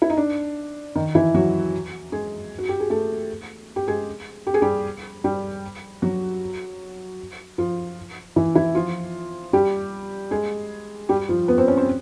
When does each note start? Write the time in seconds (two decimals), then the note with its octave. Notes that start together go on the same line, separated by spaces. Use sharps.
0.02 E4
0.10 D#4
0.17 D4
0.95 D#3 D#4
1.15 E3 E4
1.34 F#3 F#4
2.12 G#3 G#4
2.58 F#4
2.69 G4
2.80 G#4
2.90 A3 A4
3.76 G4
3.88 G#3 G#4
4.47 G4
4.54 G#4
4.62 G3 G4
5.24 G3 G4
6.02 F#3 F#4
7.58 F3 F4
8.36 E3 E4
8.55 E3 E4
8.75 F3 F4
9.53 G3 G4
10.31 G#3 G#4
11.09 G3 G4
11.29 F3 F4
11.48 B3 B4
11.58 C4 C5
11.68 C#4 C#5
11.77 C4 C5